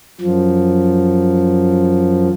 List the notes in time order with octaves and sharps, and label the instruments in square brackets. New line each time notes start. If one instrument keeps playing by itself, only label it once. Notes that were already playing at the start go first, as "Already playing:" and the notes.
[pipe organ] F#2 F3